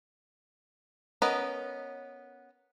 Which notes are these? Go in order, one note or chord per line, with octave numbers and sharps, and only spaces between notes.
B3 C#4 A#4 B4 D#5